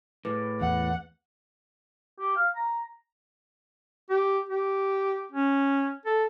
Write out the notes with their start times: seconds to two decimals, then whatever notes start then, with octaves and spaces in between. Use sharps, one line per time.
0.25 A2 G#4 B4 D6
0.61 E2 F#5
2.19 G4
2.36 F5
2.55 A#5
4.10 G4
4.49 G4
5.32 C#4
6.06 A4